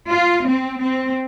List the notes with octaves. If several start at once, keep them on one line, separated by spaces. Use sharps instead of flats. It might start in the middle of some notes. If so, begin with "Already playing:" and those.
F4
C4
C4